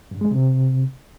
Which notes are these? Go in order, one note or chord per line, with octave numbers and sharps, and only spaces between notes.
G2
G#3
C3